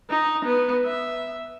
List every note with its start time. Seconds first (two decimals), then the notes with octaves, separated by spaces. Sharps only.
0.10 D#4
0.45 B3
0.86 E5